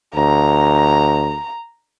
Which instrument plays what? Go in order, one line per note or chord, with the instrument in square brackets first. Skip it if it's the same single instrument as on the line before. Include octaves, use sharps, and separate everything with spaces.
[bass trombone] D2 [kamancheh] A#5